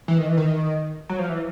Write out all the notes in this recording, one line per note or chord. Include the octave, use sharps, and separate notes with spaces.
E3
D#3
E3
D#3
F#3
F3
E3